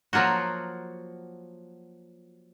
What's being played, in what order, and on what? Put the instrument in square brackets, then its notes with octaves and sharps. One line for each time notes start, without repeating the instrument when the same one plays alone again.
[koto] F3 F#3 A#3 F4 F#4